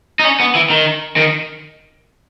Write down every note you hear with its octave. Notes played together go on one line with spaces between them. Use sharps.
D#4
C#4
B3
E3
D#3
D#3